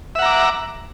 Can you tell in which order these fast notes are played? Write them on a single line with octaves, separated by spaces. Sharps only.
E5 F#5 A#5 D6